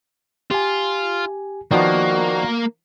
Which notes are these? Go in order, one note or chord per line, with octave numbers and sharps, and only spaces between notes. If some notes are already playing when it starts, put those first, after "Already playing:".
F4 G4 G#5
D#3 F3 A#3 B3 F#4 D5